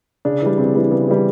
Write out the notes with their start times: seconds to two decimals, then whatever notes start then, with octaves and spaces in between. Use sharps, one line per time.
0.25 C#3 D4
0.42 E3 G3
0.58 C#3 C4
0.75 E3 G3
0.91 C#3 B3
1.08 E3 G3